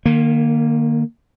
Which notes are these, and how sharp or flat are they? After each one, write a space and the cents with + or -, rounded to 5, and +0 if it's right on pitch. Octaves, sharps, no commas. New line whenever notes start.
D#3 -35 A#3 +0